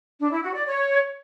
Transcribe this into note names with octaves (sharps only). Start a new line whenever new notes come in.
D4
E4
F#4
D5
C#5